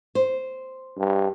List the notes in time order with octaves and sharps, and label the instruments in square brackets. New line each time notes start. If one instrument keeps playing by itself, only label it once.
[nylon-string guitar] C5
[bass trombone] G2